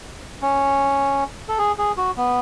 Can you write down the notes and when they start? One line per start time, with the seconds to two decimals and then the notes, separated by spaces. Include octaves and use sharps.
0.42 C#4
1.48 A4
1.58 G#4
1.78 G#4
1.97 F#4
2.17 B3